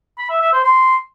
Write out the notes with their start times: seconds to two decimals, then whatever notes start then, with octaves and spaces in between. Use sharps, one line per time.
0.18 B5
0.30 E5
0.41 E5
0.53 C5
0.64 C6